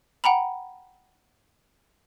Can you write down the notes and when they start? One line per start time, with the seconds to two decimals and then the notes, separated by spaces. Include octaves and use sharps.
0.24 F#5 G5 A#5 B5